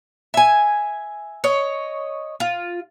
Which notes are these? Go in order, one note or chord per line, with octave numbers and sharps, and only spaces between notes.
E5 G#5
C#5 D#5
F4